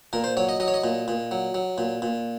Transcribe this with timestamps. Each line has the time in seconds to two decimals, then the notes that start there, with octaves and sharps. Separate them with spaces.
0.13 A#2 A#4
0.24 C5
0.37 F#3 C#5
0.49 D#5
0.60 F#3 D#5
0.68 C#5
0.74 D#5
0.84 A#2
1.08 A#2
1.31 F#3
1.54 F#3
1.78 A#2
2.02 A#2